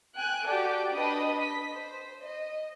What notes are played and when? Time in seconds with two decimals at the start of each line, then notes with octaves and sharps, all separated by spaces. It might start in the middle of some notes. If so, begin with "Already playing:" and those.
0.16 G5 G#5 F#6
0.46 F#4 G4 A4 D5 G5
0.93 D4 B4 D#5 B5 D#6
1.42 B6
1.73 C5
2.24 D#5